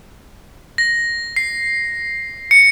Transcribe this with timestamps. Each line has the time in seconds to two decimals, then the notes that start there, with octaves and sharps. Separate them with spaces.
0.78 A#6
1.36 C7
2.51 C#7